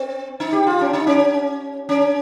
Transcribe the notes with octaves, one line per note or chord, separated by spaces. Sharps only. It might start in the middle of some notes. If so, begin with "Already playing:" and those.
Already playing: C4
D#4
G4
F4
C#4
D#4
C#4
C#4